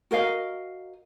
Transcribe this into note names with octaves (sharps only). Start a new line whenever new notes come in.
F#4 A#4 D#5 F5